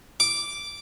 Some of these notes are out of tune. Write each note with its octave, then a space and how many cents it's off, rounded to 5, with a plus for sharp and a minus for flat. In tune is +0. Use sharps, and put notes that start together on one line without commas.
D6 -5